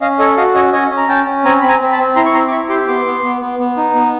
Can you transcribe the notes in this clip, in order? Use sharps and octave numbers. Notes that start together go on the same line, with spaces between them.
C#4 D#5 F5
A4 C#5 D#5
F#4 D#5 F5
C#4 C#5 D#5
C#4 C#5 D#5
C#4
A#5
C#4 G5 A5
C#4
C4 G#5 A#5
C4 B5
G#5 A#5
C4
A5 B5
C4
E4 A#5 C6
C#6
C4 A#5 C6
D6
E4 B5 C#6
G4 C6 D6
B3 C6 D6
B3
B3
B3
B3
D#4
B3